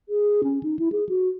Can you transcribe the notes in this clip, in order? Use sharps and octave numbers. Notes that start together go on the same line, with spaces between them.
G#4
C#4
D#4
E4
G#4
F#4